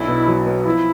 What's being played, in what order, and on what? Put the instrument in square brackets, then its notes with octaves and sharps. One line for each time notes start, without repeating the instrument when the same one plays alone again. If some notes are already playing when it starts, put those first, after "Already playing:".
Already playing: [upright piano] B1 D4 [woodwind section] E4
[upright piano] B2
F#3
B3
[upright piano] F3 [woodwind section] E4